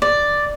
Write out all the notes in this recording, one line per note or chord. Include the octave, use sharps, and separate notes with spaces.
D5